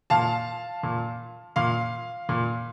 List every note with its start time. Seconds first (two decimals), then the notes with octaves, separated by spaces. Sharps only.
0.10 A#2 F5 A5
0.83 A#2
1.56 A#2 F5
2.29 A#2